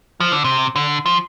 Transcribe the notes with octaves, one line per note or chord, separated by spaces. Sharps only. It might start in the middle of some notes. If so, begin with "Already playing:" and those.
F3
D3
C3
D3
F3